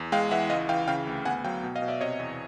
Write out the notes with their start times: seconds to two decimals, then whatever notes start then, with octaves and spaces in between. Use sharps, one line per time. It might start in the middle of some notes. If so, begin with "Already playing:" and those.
Already playing: E2
0.12 G#3 F5 G5
0.31 E3 E5 F#5
0.50 C#2 D#5 F5
0.69 E3 F5 G5
0.88 C#3 F5 G5
1.07 D2
1.25 B3 F#5 G#5
1.44 F#3 F5 G5
1.63 B2
1.76 D#5 F5
1.82 B2
1.88 D5 E5
2.01 C3 C#5 D#5
2.19 E2